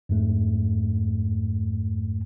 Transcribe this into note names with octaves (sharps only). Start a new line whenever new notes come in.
F2 G#2 A3